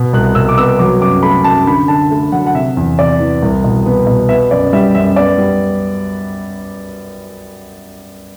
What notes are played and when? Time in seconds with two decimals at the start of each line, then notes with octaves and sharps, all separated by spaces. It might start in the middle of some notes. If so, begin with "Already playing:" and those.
Already playing: B2
0.13 C2 F#6
0.35 C2 E6
0.49 D6
0.58 B3 E6
0.79 F#3 D6
1.01 F#2 D6
1.23 A3 B5
1.44 F#2 A5
1.67 D3 B5
1.88 D3 A5
2.11 A3
2.32 F#3 F#5
2.47 F#5
2.55 C3 E5
2.77 E2
2.98 C3 D5
3.20 E3
3.42 C2
3.64 B2
3.86 B3
4.07 B2
4.29 B3 E5
4.51 F#2 D5
4.73 G3 E5
4.94 F#2 E5
5.16 B3 D5
5.38 G3